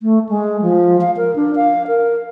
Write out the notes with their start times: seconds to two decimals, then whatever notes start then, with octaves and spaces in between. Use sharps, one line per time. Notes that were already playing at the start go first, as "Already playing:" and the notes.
0.03 A3
0.29 G#3
0.62 F3
1.01 F5
1.17 A#4
1.36 D4
1.56 F5
1.87 A#4